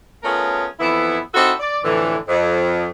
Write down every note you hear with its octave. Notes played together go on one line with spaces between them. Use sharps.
A3 B3 C#4 F4 G#4 A#4
F2 E3 B3 E4
C4 D#4 E4 F#4 A4
D5
F2 A2 D3 E3
F2